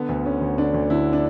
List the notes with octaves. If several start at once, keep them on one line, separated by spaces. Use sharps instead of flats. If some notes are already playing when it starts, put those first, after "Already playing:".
Already playing: D3 B3
D2
D3 C#4
D2
D3 D4
D2
D3 E4
D4